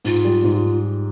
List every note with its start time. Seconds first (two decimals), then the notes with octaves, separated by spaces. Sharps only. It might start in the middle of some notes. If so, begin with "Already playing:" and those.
0.05 G#2 F4
0.25 G3
0.44 G#2